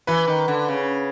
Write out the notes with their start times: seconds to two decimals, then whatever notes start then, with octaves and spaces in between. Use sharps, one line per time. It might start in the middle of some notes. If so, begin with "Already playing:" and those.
0.07 E3 B4
0.28 D#3
0.48 D3
0.68 C#3